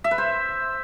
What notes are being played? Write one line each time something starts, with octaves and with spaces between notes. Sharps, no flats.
E5
B4
C5